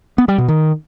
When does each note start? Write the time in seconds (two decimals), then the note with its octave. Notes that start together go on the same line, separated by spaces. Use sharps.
0.18 B3
0.28 G3
0.38 B2
0.48 D#3